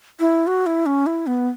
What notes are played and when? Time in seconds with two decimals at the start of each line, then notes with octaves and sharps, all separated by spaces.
0.20 E4
0.47 F#4
0.66 E4
0.86 C#4
1.06 E4
1.27 B3